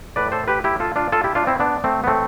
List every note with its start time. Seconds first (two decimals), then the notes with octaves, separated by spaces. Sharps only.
0.16 A2 E3 B4 D5
0.32 A4 C5
0.48 G4 B4
0.64 E4 G4
0.80 F4 A4
0.96 D4 F4
1.12 F4 A4
1.24 E4 G4
1.35 D4 F4
1.47 C4 E4
1.59 B3 D4
1.84 A3 C4
2.04 B3
2.07 A2 E3 A3 C4